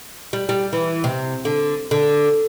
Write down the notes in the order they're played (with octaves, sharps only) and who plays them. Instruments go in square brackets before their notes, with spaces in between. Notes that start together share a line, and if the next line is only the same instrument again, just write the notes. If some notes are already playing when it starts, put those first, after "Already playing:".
[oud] G3
G3
E3
C3
D3
D3